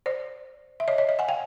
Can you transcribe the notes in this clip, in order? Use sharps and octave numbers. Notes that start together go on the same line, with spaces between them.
C5 D5
E5
C#5 D#5
C#5 D#5
C#5 D#5
F#5 G#5
F5 G5